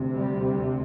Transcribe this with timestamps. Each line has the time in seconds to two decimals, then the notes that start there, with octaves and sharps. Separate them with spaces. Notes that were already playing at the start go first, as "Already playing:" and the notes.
Already playing: D2 C3
0.14 G3